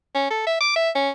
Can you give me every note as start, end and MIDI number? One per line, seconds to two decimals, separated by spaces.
0.15 0.30 61
0.31 0.43 69
0.47 0.57 76
0.61 0.73 86
0.76 0.90 76
0.95 1.10 61